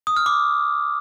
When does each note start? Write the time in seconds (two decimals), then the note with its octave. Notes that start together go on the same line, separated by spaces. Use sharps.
0.07 D#6
0.17 F6
0.26 D6